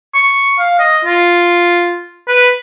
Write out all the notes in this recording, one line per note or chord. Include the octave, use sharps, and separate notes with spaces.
C#6
F5
D#5
F4
B4